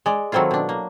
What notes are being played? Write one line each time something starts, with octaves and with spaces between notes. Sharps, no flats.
G#3 D5
D#3 F#3 A3 C4 E4 F4
B2 D4
A#3